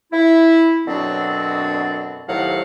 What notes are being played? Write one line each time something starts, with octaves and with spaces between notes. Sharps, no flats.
E4
F#2 B2 D3 F#3 C4 D4
C2 A2 D#3 F#3 F5 F#5